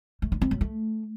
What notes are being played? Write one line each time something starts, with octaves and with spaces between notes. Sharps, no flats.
A3
D4
C4
F#3
A3